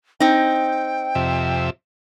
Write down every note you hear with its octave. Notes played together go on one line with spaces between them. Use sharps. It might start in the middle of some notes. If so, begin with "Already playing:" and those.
C4 D#4 G5
F2 C3 E5